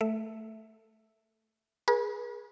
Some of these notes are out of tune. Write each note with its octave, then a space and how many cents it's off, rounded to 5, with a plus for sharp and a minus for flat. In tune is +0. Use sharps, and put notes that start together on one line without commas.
A3 +0 E5 +0
G#4 +0 B4 -45